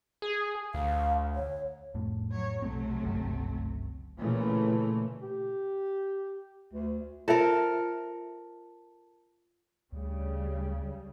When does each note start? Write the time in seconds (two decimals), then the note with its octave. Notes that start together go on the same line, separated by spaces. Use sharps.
0.22 G#4
0.74 D2 F5
1.35 C#5
1.94 F2 A2 A3
2.31 F#3 C#5
2.62 B1 C3 F#3 A3 C4
3.03 G1 C#2 F#2
4.18 A#2 C#3 E3 A3
5.22 G4
6.73 D2
7.28 F4 A4 A#4 C5 E5
9.92 D2 C#3 G3